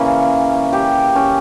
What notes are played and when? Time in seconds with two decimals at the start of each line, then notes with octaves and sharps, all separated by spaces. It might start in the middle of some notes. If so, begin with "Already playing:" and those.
Already playing: C#3 E3 A#3 C#4
0.73 G4
1.16 C#4